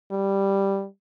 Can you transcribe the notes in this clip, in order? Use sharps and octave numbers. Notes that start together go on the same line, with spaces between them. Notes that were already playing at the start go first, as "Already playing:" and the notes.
G3